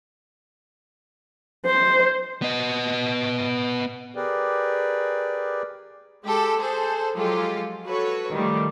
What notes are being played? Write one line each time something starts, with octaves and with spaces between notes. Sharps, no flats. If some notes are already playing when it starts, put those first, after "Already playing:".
C5
B3 D#5
G4 G#4 A#4 B4 D5 G5
G#3 G4 A4
G#4 A4 C5
F3 F#3 G#3 F4 G4 A4
F#4 A4 B4 C#5
D#3 F3 G3 A3